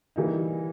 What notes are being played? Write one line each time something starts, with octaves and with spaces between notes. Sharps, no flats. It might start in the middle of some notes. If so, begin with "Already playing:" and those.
E3 G3 A#3 D#4